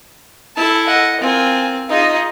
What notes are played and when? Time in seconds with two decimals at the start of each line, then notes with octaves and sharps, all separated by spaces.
0.57 E4 A4 A5
0.87 D#5 F#5
1.20 C4 F4 A#4 G#5
1.89 D#4 F4 G#4 D#5